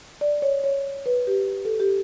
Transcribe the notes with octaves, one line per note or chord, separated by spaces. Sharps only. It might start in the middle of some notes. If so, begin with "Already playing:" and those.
D5
C#5
C#5
B4
G4
A4
G4